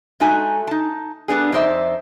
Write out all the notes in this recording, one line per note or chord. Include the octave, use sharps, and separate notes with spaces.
G#3 A3 D#4 F#4 G#5
D#4 A5
G3 B3 D4 G#4
F2 D#4 C5 D5 E5